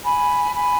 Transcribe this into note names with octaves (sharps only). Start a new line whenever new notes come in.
G#5 B5
G#5 B5